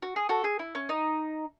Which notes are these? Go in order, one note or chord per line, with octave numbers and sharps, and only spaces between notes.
F#4
G#4
F#4 A4
G#4
E4
C#4
D#4